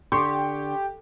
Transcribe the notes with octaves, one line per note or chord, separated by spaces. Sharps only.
D3 G4 C6 C#6